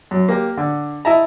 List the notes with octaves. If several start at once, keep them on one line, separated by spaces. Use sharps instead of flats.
F#2
A#3 G4
D3
E4 D#5 E5 A5 A#5